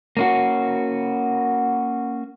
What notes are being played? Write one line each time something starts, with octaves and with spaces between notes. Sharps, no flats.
A#3 C#4 F#4